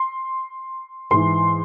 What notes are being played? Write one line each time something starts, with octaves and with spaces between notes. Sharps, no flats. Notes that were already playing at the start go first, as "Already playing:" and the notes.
Already playing: C6
G#2 E3 C6